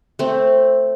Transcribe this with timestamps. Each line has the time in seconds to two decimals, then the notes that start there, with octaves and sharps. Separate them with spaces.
0.19 A3 C4